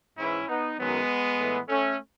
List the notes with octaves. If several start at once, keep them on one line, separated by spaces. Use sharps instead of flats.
G#2 E3 C#4 E4
B3 D#4
F#2 D#3 F#3 G#3 B3
A2 E3
A3 C#4